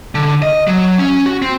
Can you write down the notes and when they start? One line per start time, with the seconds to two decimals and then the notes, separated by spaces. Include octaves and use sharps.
0.15 D3
0.42 D#5
0.67 F#3
0.98 C#4
1.26 F#4
1.42 C4